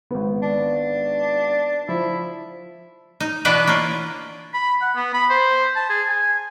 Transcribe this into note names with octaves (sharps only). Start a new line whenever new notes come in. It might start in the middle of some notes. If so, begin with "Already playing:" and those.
G#1 B3
D4
F3 E4
D#4
B2 E3 B3 D4 B4 D#5
A#3 C#4 F4
B5
F#5
B3
B5
C5
A5
G#4
G#5